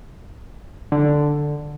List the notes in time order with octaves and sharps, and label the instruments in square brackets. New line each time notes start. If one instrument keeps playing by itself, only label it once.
[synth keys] D3